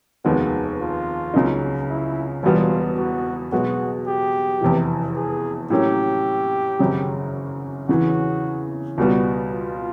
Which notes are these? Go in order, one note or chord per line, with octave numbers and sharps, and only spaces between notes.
F1 D#2 D#3 G#3 B3 F#4
F4
C#2 C#3 F#3 A#3 D#4
E4
E1 E2 B2 G3 B3 F4
F#4
B1 B2 G#3 B3 F#4
G4
F1 E2 C3 E3
G#4
A2 F#3 A#3 C#4 G4
G#1 F#2 C#3 F#3
E2 C#3 E3 F#4
C#2 B2 G3 B3 F#4
F4